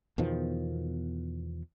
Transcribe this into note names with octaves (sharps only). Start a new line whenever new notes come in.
E2 B2 D#3 F3